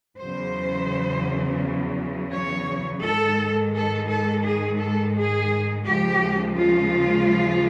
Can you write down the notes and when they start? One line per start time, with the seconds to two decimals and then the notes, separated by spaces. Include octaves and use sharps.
0.20 E2 C#3 F#3 C5
2.33 C#5
3.03 G#2 D#3 G#3 A4
3.74 A4
4.10 A4
4.45 G#4
4.80 A4
5.16 G#4
5.86 D#2 C#3 F3 G#3 G4
6.58 F4